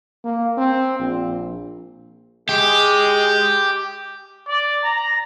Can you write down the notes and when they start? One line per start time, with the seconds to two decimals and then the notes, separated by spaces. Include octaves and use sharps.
0.24 A#3
0.57 C4
0.99 A#1
2.49 G#3 G4
4.48 D5
4.83 A#5